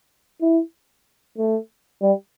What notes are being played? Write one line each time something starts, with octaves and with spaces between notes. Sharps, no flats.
E4
A3
G3